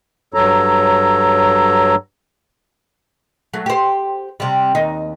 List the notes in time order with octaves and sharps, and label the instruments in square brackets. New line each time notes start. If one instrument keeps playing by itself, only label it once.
[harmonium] G2 F#3 A4 C#5 A#5
[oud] F#3 A3
G4 C5
C3 G3
D#2 D#4